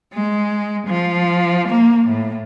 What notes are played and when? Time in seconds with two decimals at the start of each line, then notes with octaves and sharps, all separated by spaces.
0.14 G#3
0.87 F3
1.68 A#3
2.08 A2